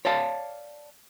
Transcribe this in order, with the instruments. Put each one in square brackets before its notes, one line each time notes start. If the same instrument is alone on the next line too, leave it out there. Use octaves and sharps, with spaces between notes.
[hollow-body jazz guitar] C#5 D5 F5 A5